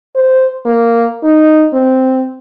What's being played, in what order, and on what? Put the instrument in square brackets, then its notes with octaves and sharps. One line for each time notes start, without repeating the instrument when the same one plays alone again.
[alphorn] C5
A#3
D#4
C4